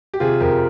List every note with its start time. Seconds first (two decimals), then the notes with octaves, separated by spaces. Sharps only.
0.14 G4
0.20 C3 F4 G#4
0.41 F2 G4 A#4